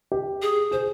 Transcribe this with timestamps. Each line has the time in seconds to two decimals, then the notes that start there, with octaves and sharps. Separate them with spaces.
0.12 G4
0.42 G#4
0.71 G#4 C5